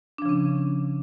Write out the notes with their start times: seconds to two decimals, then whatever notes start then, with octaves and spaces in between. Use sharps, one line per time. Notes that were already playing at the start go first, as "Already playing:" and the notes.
0.18 D4
0.22 F3
0.26 C#3
0.29 C#4